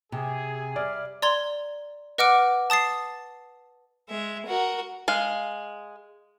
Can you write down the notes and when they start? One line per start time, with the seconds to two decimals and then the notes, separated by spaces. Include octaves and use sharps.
0.12 C3 G#4
0.76 G3 D5 E5 F6
1.22 D5 A#5 C6 G#6 G7
2.18 B4 D#5 F#5 D6 F6 D7
2.70 A5 D#6 A6 C7
4.09 G#3 E5
4.46 F#4 A#4
5.08 G#3 F5